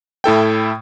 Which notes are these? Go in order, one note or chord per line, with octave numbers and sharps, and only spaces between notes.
A2 E4 A4 G5